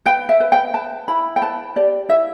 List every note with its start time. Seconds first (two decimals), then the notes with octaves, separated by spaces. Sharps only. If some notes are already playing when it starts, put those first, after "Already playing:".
0.06 B4 G5
0.29 E5
0.40 B4
0.52 G5
0.74 B4 A5
1.08 E4 B5
1.36 G5
1.42 B4 A5
1.76 G4 D5
2.09 E4 E5